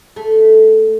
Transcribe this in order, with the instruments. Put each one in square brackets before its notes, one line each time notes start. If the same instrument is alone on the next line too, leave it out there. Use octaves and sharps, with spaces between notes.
[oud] A3